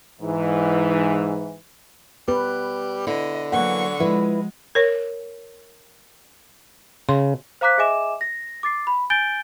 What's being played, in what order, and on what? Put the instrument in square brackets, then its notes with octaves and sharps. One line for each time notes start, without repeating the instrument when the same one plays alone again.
[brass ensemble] G#2 E3
[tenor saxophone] G3 [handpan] B3 B4
[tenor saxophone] D3 [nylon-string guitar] E4 [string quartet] D#5
[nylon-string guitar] E3 A#3 [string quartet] F#3 C#6 [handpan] F#5
[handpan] F3 [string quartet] G#3 [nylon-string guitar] E4 B4 E5
[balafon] A#4 C#5
[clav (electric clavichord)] C#3 [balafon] C6
[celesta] C5 F5 A#5 D6 F#6 B6
G#4 D#5 E5 G#5 D6 E7
A#6
D6 A6 C7
B5
G#5 G6 A6 D7 G7